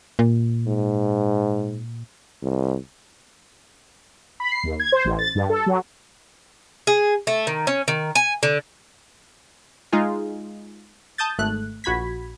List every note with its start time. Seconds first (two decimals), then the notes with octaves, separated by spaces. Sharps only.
0.19 A#2
0.67 G#2
2.43 C2
4.40 B5
4.51 C7
4.64 D#2
4.80 G#6
4.92 C5
5.05 A1
5.19 A6
5.35 G2
5.50 A4
5.66 F#3
6.87 G#4
7.27 A3
7.47 D#3
7.67 C#4
7.88 D#3
8.15 G#5
8.43 D3
9.92 G#3 D#4 F4 G#4
11.18 A5 D#6 G6 A6
11.38 G#1 A3 F#6
11.84 A#1 F#4 B5 G#6 B6